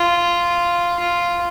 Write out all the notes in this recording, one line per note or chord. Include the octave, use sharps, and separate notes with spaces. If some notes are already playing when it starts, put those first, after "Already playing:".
Already playing: F4
F4